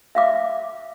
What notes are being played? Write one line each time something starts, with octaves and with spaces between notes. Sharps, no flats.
E5 F5 D6